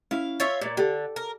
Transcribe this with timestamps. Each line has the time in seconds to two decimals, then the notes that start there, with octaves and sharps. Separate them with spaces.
0.11 C#4 E4 F5
0.40 F4 C#5 E5
0.61 A#2 C#5 D5
0.77 D3 G4 A4
1.16 A#4